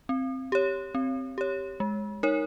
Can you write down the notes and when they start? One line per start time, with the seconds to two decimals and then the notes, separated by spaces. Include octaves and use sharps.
0.09 C4
0.52 G4 C#5
0.95 C4
1.38 G4 C#5
1.80 G#3
2.23 D#4 A#4 C#5